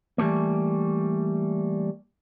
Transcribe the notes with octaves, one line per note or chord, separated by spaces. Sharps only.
E3 G3 A3 A#3